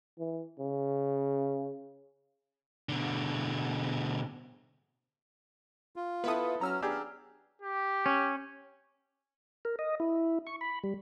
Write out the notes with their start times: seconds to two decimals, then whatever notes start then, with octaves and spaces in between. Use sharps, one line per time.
0.19 E3
0.59 C#3
2.89 B2 D3
5.96 F4
6.24 B3 E4 A4 B4 E5 D#6
6.61 F#3 C#4 A#5 E6 F6
6.82 B3 D4 G4 G#4
7.62 G4
8.06 C#4
9.65 A#4
9.79 D#5
10.00 E4
10.47 C#6
10.61 B5
10.84 G3